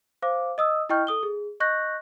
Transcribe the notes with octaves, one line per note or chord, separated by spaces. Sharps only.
C5 F5 D6
D#5 D#6 E6
E4 D#5 G5 C#6 F6 G6
A4 D#6 G7
G#4
D#5 C#6 F#6 G6 A#6